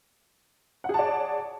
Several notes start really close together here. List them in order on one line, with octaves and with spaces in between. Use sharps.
F#5 G#4 A5 D5 C#5